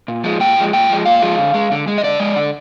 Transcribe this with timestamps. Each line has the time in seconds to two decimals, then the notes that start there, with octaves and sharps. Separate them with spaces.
0.08 A#2
0.24 F3 G#3
0.40 A#2 G5
0.56 F3 G#3
0.73 A#2 G5
0.89 F3 G#3
1.05 A#2 F5
1.22 F3 G#3
1.38 D3
1.54 G#3
1.72 D3
1.87 G#3
1.98 D#5
2.03 D3 D5
2.20 G#3
2.36 D3